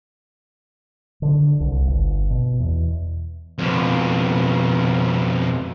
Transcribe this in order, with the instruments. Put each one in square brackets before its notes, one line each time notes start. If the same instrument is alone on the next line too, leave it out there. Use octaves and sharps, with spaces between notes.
[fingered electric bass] D3
C2
G1
B2
E2
[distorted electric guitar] F2 B2